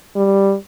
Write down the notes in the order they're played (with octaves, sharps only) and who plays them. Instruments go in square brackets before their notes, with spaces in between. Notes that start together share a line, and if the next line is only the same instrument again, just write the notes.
[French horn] G3